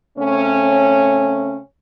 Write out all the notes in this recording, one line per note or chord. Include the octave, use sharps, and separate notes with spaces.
C#3 A3 C4 C#4